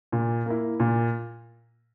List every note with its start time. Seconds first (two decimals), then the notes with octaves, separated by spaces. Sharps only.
0.12 A#2
0.46 A#3 E4
0.80 A#2